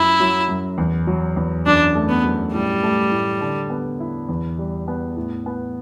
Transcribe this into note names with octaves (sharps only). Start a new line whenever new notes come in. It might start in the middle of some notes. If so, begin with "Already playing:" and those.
Already playing: F#2 E4
F#3
F#2
E2
F#3
E2
F#2 D4
A3
B3
F#2
A2 G3
A3
A2
D3
B3
E4
E2
G3
B3
A2
B3